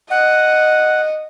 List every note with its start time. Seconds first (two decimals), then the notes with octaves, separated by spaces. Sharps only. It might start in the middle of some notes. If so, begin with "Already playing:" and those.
0.10 D#5 F#5